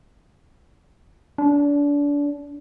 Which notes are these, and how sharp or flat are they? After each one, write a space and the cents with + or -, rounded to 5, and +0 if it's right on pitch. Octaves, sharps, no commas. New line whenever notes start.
D4 -30